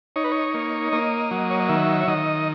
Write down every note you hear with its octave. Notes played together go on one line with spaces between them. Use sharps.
D#4 C#5
B4
C#5
A#3
A#3 D#5
F#3
C#5
D#5
D#3 E5
C#5
D#3 D#5